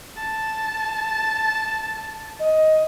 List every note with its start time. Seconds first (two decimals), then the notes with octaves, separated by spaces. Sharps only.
0.16 A5
2.40 D#5